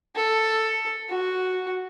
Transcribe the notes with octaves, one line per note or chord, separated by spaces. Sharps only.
A4
F#4